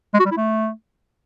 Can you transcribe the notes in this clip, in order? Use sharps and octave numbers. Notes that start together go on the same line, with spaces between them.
G#3
F#4
G3
E4
A3